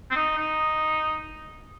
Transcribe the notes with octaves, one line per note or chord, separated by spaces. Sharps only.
C4
D#4
D#4